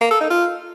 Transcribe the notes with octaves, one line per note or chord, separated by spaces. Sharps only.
A#3
A4
D#4
F4